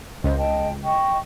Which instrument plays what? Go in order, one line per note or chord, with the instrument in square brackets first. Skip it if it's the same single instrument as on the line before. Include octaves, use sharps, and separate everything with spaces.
[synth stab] C#2 [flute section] C5 D#5
[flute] D#5 [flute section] G5 A5
[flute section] D#5 C#6 [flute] G5